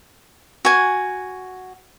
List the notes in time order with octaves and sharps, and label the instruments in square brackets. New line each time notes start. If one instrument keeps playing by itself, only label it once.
[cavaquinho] F#4 G#5